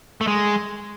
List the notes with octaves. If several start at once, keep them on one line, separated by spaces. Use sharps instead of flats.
A3
G#3